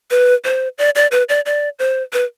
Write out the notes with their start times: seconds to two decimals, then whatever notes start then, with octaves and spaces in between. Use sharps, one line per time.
0.11 B4
0.45 C5
0.78 D5
0.95 D5
1.11 B4
1.29 D5
1.46 D5
1.79 C5
2.13 B4